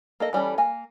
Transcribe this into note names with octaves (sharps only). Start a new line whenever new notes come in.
A#3 A4 D#5
E3 G3 C#4 A4
A#3 G#5